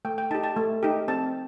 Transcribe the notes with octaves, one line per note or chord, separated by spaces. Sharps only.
A3 G5
G5
D#4 G4 A5
A5
A3
D#4 G4
C4 A5